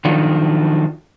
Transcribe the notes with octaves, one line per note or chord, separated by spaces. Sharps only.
D#3 F3 F#3 D4 F4 A4